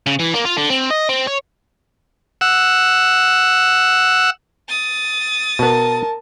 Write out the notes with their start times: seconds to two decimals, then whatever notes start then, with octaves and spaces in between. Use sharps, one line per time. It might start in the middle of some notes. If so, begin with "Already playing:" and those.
0.06 C#3
0.19 E3
0.34 A#3
0.45 F4
0.57 D3
0.70 C4
0.90 D#5
1.09 C4
1.27 C#5
2.41 F#5 E6
4.68 D#6 A6
5.59 B2 B3 A#4 A5